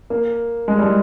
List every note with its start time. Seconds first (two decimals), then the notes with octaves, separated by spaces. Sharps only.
0.10 A#3
0.68 G#3
0.78 G3
0.82 G#3